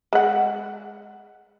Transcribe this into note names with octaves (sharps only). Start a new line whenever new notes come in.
G#3 F#5